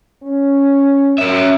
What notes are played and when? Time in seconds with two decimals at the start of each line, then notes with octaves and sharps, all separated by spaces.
0.23 C#4
1.18 F#2 C#4 E5